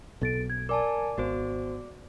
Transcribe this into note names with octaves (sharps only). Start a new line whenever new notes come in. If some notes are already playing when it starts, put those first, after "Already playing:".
B1 B2 A4 A6 D7
G#6
A#4 D5 G#5 A5 D6
G#1 B3 F#4 C5